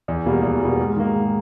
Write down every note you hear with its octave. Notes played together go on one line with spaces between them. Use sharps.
E2
B2 G3 A#3
E2
B2 G3 A#3
G#2
D#3 A#3
G#2